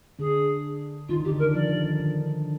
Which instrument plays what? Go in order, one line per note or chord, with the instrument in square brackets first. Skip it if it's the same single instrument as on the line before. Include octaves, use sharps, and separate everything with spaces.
[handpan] D3 D4 [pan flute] G#4
[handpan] D#3 D#4 [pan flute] F4
[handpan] D3 D4
[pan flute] G4
[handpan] D3 D4
[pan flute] A#4
[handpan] D#3 D#4
[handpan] F3 F4 [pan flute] D5
[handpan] D#3 D#4
D#3 D#4
D3 D4